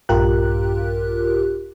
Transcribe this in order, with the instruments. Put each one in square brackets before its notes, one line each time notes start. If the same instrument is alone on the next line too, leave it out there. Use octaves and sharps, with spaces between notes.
[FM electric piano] A#1 G2 F4 G4 A#4 F#6